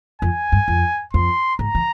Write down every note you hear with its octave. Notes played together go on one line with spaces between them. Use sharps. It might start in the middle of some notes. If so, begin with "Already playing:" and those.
F2 G#5
G2
F2
F2 C6
G#2 A#5
E3